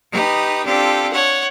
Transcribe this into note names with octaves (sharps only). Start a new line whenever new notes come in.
D#4 G4 B4 D#6
C4 D4 F4 G4 A4
C#5 F#5